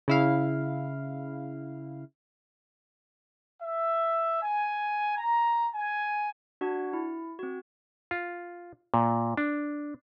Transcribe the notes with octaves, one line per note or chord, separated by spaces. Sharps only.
C#3 E4 F5
E5
G#5
A#5
G#5
D4 F#4 F#5
E4
C4 F#4
F4
A#2
D4